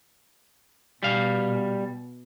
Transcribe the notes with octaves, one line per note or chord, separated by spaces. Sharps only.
B2 G3 F5